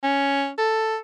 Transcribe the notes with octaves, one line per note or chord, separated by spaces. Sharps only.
C#4
A4